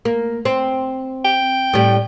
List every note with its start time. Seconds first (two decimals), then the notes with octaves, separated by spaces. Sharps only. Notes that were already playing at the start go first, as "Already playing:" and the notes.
0.05 A#3
0.45 C4
1.25 G5
1.73 A2 G3